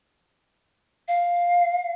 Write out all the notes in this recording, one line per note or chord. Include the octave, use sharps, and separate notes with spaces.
F5